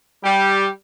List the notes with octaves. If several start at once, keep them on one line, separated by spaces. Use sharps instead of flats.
G3 G4